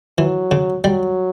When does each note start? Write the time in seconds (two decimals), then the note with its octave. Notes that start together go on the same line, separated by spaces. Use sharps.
0.18 E3 F#3
0.51 C#3
0.84 F#3 G3